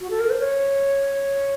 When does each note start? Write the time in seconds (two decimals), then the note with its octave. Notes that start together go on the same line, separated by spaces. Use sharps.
0.01 F#4
0.10 A4
0.20 A#4
0.30 C5
0.39 C#5